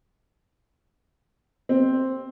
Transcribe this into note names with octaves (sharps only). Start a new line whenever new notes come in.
C4